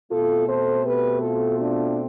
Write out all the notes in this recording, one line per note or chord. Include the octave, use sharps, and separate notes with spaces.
B2 A3 C4 F4 A4
A4 C5
G4 B4
F4 A4
D4 F4